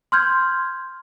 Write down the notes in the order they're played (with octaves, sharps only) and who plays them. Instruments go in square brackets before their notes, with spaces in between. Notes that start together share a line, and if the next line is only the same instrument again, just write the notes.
[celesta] C6 F6 G6 G#6